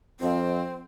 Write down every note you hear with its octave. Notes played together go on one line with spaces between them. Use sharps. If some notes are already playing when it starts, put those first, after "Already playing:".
F2 C4